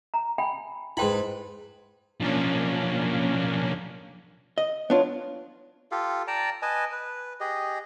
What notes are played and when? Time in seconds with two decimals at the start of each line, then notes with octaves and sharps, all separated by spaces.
0.14 A#5
0.38 G5 G#5 B5
0.97 G#2 E4 B4 G5 B5 C6
2.20 B1 F3 A#3 C#4 D4
4.58 D#5
4.90 B3 D4 F4 C#5
5.91 F4 G4 A4 F5
6.28 D5 G5 A5 A#5
6.62 B4 D#5 G#5 A5
6.92 B4
7.40 G4 G#4 D#5